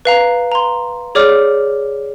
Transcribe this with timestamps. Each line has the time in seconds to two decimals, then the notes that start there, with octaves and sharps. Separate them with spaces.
0.05 B4 F5 A#5
0.52 A#5 C6
1.15 G#4 C#5 D5 D6 F6